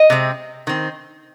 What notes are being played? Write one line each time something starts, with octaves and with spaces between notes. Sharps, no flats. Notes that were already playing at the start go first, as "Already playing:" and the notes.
Already playing: D#5
C3 G#3 C4
D#3 C4